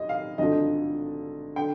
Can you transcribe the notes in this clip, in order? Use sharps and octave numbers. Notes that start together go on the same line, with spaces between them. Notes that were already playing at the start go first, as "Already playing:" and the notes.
Already playing: D#2 D#5
F5
G#1 G2 D3 F3 D#5
D3 G5